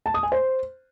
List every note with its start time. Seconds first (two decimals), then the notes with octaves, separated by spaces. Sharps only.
0.06 A5
0.14 D#6
0.23 G#5
0.32 C5